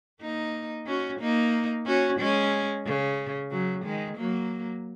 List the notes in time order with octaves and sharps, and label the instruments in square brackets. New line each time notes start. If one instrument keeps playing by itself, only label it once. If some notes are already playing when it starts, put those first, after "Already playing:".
[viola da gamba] A#3 D#4
C#4 F#4
A#3 D#4
C#4 F#4
G#3 C#4
C#3
C#3 F#3
D#3 G#3
F#3 A#3